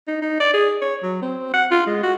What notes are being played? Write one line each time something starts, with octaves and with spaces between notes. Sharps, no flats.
D#4
D#4
D5
G#4
C#5
F#3
C4
F#5
F4
G#3
F#4